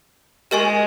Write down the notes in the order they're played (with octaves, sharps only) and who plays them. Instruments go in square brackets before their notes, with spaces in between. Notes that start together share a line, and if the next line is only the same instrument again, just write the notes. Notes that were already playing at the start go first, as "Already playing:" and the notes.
[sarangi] G#3 [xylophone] G4 A#4 D#5 G#5 C#6